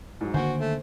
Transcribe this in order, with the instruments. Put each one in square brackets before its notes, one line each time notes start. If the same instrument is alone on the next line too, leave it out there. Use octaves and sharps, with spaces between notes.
[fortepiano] G#2 F#3
[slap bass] D3 D#3 A#3 [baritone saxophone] F#4 [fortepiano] C5 G#5
[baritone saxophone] A3